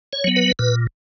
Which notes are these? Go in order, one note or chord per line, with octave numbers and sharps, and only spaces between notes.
C#5
F#3 B3
B4
A#2 B4